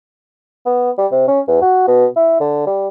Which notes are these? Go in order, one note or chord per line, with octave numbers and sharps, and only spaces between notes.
B3
G3
C3
C#4
E2
F#4
B2
E4
D3
G3